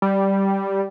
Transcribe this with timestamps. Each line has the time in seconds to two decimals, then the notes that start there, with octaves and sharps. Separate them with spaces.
0.02 G3